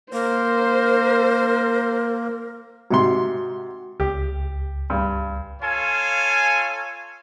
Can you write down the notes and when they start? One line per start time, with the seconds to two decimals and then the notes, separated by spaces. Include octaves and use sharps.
0.13 A#3 A#4 C5
2.91 G#2 C3 F#4 C6
4.00 C#2 G4
4.90 G2
5.61 F4 A4 C#5 F5 G#5